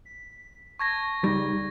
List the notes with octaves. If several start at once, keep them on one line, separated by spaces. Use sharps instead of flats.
B6
A5 C#6 G#6 A#6
C#2 G3 D#4 A#6